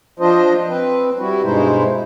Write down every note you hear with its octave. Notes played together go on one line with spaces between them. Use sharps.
F3 D4 F4 C5 D#5
C4 B4
G3 E4 F#4
G2 B2 G#3 D#4 E4 C5